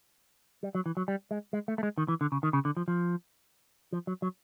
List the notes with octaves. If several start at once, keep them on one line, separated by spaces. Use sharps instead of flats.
G3
F#3
E3
F#3
G3
G#3
G#3
A3
A3
G#3
D#3
E3
D3
C#3
D#3
C#3
D3
F3
F3
F3
F#3
F#3